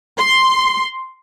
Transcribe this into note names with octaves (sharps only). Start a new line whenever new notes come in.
C6